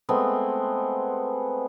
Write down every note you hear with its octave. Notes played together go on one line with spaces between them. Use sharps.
G#3 A3 B3 C4